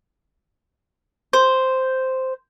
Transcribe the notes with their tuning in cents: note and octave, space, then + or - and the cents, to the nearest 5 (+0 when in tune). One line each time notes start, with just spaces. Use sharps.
C5 -5